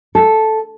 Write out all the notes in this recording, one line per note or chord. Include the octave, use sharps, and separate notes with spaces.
A4